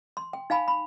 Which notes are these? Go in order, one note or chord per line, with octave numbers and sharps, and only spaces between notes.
C6
G5
D#4 F5 G#5 B5
B5